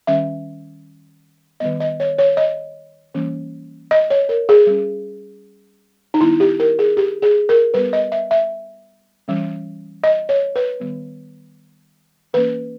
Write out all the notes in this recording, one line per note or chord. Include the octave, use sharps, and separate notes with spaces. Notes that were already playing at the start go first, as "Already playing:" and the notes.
D#3 G3 C#4 E5
D#3 G3 B3 D#5
D#5
C#5
C#5
D#5
E3 G3 A#3 C#4
D#5
C#5
A#4
G#4
G3 C#4
D#4
D#3 G3 B3 E4
G4
A#4
G#4
G4
G#4
A#4
G3 B3 B4
D#5
E5
E5
E3 G3 C#4
D#5
C#5
B4
D#3 G3 B3
E3 A#3 C#4 B4